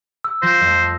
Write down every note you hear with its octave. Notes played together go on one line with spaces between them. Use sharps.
E6
F3 C5 A#6
F2 A3 D#6